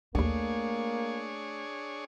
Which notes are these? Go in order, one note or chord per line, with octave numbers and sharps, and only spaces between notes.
A#1 D#2 A3 A#3 D4 G#4 C#5